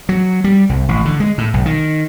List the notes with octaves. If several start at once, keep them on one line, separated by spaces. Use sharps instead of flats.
F#3
G3
C2
A1
D3
G#3
A2
B1
D#3